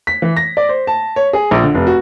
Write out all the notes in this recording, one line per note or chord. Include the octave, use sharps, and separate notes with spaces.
B6
E3
A#6
D5
C5
A5
C#5
G#4
A#1
D3
F1
F#4